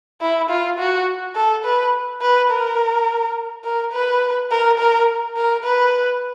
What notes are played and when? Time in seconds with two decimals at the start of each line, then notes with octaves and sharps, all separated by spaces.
0.21 E4
0.50 F4
0.79 F#4
1.36 A4
1.65 B4
2.21 B4
2.50 A#4
3.64 A#4
3.93 B4
4.51 A#4
4.79 A#4
5.37 A#4
5.64 B4